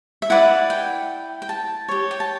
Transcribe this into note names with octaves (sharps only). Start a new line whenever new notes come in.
E5
E4 B4 D5 F#5
G5
G5
A5
G4 C#5
G5
A5